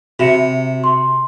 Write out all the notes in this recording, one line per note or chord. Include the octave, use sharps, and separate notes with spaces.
C3 F#4 E5 C#7
C6